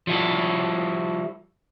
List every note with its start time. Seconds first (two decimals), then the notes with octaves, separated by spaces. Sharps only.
0.07 F3 G3 E4 F#4 A4